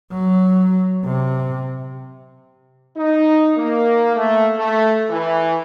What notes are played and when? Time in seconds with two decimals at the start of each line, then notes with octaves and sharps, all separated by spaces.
0.12 F#3
1.04 C3
2.97 D#4
3.57 A#3
4.16 A3
4.57 A3
5.10 E3